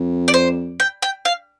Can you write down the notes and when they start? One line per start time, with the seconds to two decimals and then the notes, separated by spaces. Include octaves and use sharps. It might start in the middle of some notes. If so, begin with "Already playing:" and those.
Already playing: F2
0.28 D5
0.34 C5
0.80 G5
1.02 G5
1.25 F5